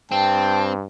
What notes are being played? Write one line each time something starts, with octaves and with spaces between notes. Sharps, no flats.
G2 C4 G5 A5